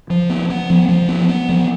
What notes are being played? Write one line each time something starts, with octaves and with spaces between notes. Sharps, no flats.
F3
B3
B3
F3
F3
B3
B3
F3